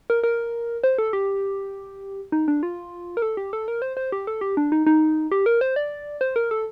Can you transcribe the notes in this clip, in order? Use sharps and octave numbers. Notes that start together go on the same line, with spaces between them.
A#4
A#4
C5
A4
G4
D#4
D4
F4
A#4
A4
G4
A4
A#4
C5
C5
G4
A4
G4
D4
D#4
D#4
G4
A#4
C5
D5
C5
A#4
A4